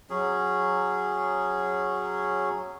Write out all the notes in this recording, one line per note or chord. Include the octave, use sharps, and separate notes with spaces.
F#3 C#4 G#4